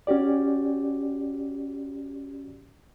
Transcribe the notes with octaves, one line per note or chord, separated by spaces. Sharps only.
C#4 F#4 G4 D5